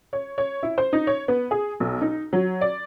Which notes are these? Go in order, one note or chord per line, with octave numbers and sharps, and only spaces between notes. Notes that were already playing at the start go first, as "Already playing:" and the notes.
C#5
C#5
E4
C5
D#4
C#5
B3
G#4
B1
D#4
F#3
D5